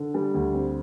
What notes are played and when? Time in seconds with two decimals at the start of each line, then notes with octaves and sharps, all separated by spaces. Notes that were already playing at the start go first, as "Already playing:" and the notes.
Already playing: D3
0.14 G3
0.34 D2
0.54 C4